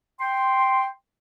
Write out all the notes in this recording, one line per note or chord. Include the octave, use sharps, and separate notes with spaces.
G5 C6